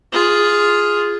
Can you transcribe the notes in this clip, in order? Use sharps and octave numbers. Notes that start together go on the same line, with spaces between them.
F4 G#4